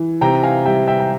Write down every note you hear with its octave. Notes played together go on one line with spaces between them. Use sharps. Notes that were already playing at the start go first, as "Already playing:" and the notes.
Already playing: E3
C3 G5 A#5
F5 G#5
G3 E5 G5
E5 G5
G5